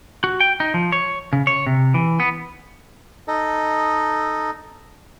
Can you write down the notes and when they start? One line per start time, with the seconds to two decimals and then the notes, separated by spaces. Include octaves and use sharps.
0.24 F#4
0.40 G5
0.60 D#4
0.74 F3
0.92 C#5
1.33 C#3
1.47 C#5
1.67 C3
1.94 E3
2.20 B3
3.28 D#4 A4 D#5